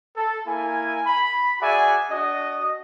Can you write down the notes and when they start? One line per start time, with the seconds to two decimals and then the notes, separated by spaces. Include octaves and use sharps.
0.16 A4
0.47 A#3 E4 G#5
1.06 B5
1.61 F#4 G#4 D5 E5 G#5
2.10 D4 F#4 D#5